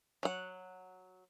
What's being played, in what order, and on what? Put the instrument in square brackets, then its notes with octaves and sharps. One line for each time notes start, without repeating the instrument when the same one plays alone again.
[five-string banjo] F#3 F#5